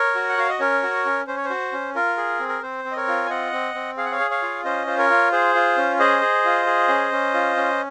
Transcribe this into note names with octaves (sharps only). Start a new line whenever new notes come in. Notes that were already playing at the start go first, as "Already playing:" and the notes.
Already playing: A#4 C#5
F#4
F#5
F#4 F5
D#5
C#4 A#4 C#5
F#4
C#4
C#4 C5
C#5
C5
F#4
C#4
F4 A#4
G#4
C4
A#4
C4 C5
C4
D#5
A#4 C#5
F4
G#5
C4 D#5 F#5
C4
C4
G#4 F5
F#5
C#5 F5
G#4
C#5 F5
F4
C#4 C5 D#5
F4 C5
A#4 C#5
F4
G#4 C5
F4
C#4
G#4 C5 D#5
G#4
F4
G#4
C#4
C#4
F4
C#4